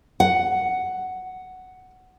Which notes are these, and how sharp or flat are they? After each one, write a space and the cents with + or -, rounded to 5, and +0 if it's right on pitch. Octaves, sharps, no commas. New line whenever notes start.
F#5 +5